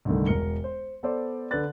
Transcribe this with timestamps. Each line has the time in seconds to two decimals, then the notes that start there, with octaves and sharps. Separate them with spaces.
0.05 C2 G2 D3 D#3 A3
0.26 E1 A#4 C#7 G7
0.64 C5
1.03 B3 A4 C5 D5
1.51 D3 A4 B4 D5 F#6 A6